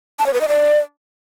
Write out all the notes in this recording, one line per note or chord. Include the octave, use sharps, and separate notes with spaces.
A5
C#5
B4
D#5
D5